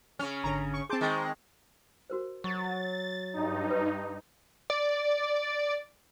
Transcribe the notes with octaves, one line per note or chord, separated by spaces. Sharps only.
C#3 C#4 F6
G#1 D3 C#5 A#5
C#6
C4 G#4 A5 C6 D6 G6
D#3 G#3
F#4 A#4 C5
F#3 C#6 A6
G2 D#4
B4
D5